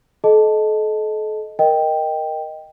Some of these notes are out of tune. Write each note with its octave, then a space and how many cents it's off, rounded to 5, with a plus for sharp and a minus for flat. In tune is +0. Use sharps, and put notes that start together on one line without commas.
A4 -35 D#5 +0 A5 +0
A#4 +0 D#5 +0 G5 +0